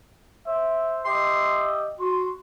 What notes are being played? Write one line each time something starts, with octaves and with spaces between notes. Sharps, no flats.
C5 E5
G4 D#5 E5 C6
F#4 C6